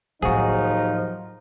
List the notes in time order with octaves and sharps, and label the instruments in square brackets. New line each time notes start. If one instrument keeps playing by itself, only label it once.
[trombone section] D#2 D#4 [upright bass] A2 F#3 [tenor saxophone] F3 [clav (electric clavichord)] F#4 G#4